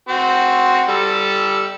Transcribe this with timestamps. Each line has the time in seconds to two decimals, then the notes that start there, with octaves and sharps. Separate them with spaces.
0.09 C4 F#4
0.89 G3 A4 E6